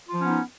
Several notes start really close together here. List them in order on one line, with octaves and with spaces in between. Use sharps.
F4 F3 C#4 B3 D#4